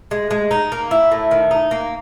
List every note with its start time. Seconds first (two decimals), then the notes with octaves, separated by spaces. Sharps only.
0.11 G#3
0.31 G#3
0.51 D#4
0.72 A#3
0.91 E4
1.11 A2
1.31 D#3
1.51 D#4
1.71 A#3